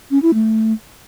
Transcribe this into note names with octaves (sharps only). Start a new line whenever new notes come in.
C#4
E4
A3